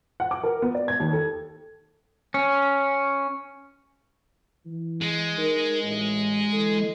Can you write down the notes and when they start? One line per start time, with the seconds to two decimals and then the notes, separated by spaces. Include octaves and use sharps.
0.20 F#5
0.31 D6
0.43 A#4
0.62 B3
0.74 D5
0.88 G#6
1.00 D#2
1.13 A4
2.34 C#4
4.66 E3
5.01 G#3
5.38 D#4 A#4
5.83 A1
6.53 D2 E3 A4